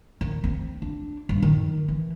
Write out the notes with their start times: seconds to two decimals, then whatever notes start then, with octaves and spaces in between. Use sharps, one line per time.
0.21 D#3
0.44 C4
0.82 D4
1.29 G2
1.42 D#3
1.88 E3